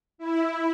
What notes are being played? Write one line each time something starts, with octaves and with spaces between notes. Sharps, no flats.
E4